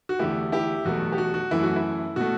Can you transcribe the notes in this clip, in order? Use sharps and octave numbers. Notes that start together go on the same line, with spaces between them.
F#4
E2 D3 A3 E4 G4
E4 G4
E2 B2 F#3 A3 F#4
G4
F#4
F#4
F#2 E3 A3 E4
F#4
E4
B2 A3 F#4